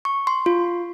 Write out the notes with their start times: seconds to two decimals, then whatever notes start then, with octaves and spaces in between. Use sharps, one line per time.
0.05 C#6
0.27 C6
0.46 F4